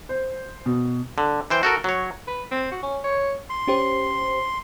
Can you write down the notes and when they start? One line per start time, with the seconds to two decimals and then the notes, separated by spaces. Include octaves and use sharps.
0.09 C5
0.66 B2
1.18 D3
1.50 E3 C5 G5
1.63 F#4 A4 A#4
1.84 F#3 C#5
2.27 B4
2.51 C4
2.71 F#4
2.83 C#4
3.04 C#5
3.50 C6
3.67 C#4 G4 C5